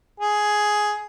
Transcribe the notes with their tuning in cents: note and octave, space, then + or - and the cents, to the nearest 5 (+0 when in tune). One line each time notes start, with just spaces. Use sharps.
G#4 +10